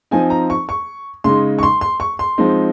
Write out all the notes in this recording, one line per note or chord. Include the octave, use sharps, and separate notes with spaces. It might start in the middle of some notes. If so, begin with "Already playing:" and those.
F3 C4 D#4 G#5
A#5
C#6
C#6
C#3 G#3 D#4 C6
C#6
C6
C6
C#6
C6
F3 G#3 C4 D#4